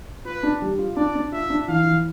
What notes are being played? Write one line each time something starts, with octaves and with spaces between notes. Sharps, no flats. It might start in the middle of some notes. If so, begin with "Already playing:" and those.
F4 B4
D4
G3
F4
D4 D5
D4
F4 E5
D4
E3 F5
E3